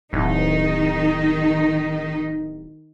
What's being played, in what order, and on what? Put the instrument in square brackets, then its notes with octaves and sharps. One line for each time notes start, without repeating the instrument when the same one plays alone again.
[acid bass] D1 [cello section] D#3 D#4